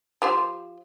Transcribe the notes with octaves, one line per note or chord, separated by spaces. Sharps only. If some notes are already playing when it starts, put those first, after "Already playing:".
F3 G4 C5